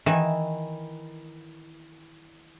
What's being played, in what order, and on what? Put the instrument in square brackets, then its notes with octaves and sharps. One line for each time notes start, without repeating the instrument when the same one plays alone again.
[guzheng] D#3 E3 E5 G#5